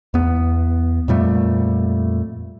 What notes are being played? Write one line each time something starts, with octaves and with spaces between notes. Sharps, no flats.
E2 B3
F2 A#2 G3 A3